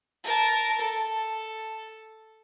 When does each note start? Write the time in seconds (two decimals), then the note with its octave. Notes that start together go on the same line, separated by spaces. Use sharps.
0.24 A#4 A5
0.80 A4